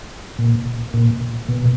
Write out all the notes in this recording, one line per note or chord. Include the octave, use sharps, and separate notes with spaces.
A#2
A#2
B2